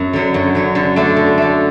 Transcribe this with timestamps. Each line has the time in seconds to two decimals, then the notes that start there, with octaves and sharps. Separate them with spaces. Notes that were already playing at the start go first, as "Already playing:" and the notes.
Already playing: F#2
0.13 D3 F#3
0.34 F#2
0.55 D3 F#3
0.75 D3
0.96 A3 D4
1.16 D3
1.38 A3 D4